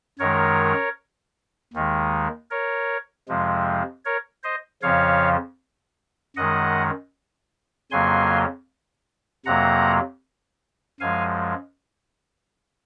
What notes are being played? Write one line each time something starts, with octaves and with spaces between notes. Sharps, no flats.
F#2 D#3 G#3 A#4 C#5
D#2 D#3 G#3
A#4 C#5
F2 C3 F3 G#3
A#4 C#5
C5 D#5
F2 C#3 F3 C#5 F5
F#2 D#3 G#3 D#5 F#5
F2 C#3 F#3 A#3 G#5 C6
F2 C3 F#3 A#3 F#5 A#5
F#2 F3 G#3 F5 G#5